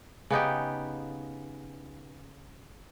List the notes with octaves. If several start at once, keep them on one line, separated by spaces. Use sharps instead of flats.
C#3 B3 D#4 G4